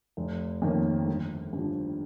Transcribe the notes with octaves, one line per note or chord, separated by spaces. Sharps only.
F1
F2 D#3 A#3 C#4
G1
G2 F3